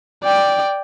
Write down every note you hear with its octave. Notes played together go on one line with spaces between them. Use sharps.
D5 G5